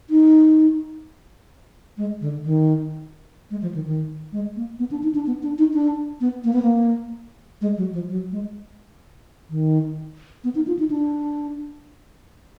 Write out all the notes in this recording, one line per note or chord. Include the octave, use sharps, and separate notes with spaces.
D#4
G#3
D3
D#3
G#3
F3
D#3
D#3
G#3
A#3
B3
D4
D#4
D4
B3
D4
D#4
D4
B3
A#3
B3
A#3
G#3
F#3
F3
F#3
G#3
D#3
B3
D#4
F4
D#4
D4